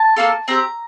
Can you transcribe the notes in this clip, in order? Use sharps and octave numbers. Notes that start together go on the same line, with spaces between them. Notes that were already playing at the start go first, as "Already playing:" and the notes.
Already playing: A5
A#3 D4 F4 A4
C4 G4 A#5